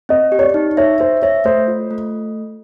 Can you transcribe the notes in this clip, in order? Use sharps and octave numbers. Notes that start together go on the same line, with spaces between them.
C4 D#5
G4
C#5
D5
D#4
C#5 E5
C5 E5
C#5 E5
A3 C5
F4
A3